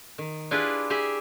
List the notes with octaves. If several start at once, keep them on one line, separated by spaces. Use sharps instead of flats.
D#3
D4 E4 F4 G4 G#4 B4
G4 G#4 E5 G#5